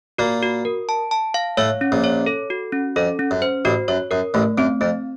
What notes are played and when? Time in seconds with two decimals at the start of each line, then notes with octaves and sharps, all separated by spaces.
0.18 A#2 A#3 F#4
0.43 F#4
0.65 A#4
0.89 A5
1.11 A5
1.34 F5
1.57 A2 A3 C#5
1.81 C#4
1.92 A#1 A#2
2.04 C#5
2.26 A4
2.50 F#4
2.72 C#4
2.96 F2 A4
3.19 C#4
3.31 F#2
3.42 C5
3.65 A1 A2 F#4
3.88 F#2 C#5
4.11 F#2 A#4
4.34 A1 A2 A3
4.58 F#2 C4
4.81 F2 C4